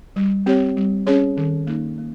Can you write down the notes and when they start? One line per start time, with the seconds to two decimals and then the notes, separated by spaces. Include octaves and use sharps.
0.16 G3
0.46 C4 G4 C#5
0.77 G3
1.07 C#4 G#4 C#5
1.37 D#3
1.67 A#3 D#4
1.98 A#3